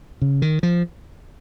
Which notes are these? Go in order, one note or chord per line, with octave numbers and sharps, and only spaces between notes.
C#3
D#3
F3